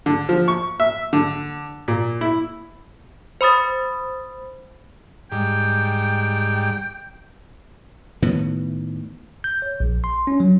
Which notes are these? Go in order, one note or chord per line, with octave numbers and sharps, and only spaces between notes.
D3
F3
C#6
E5
D3
A#2
E4
C5 B5 D#6 A6
G#2 G3 G5
A2 D#3 B3
G6
C#5
A#1
C6
C#4
F#3